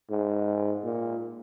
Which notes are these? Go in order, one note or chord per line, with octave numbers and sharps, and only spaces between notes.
G#2
A#2